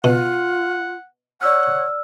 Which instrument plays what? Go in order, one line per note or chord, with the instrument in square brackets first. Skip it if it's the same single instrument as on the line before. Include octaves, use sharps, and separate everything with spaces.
[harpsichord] B2 [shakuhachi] F4 [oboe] F#5
[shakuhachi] C#5 [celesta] D5 E6 F6 [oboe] F#5